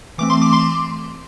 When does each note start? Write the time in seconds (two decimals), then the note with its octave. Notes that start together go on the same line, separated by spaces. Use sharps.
0.18 E3 A3 C4 D6
0.30 C6
0.42 D6
0.53 C6